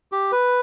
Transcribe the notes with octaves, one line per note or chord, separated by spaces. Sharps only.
G4
B4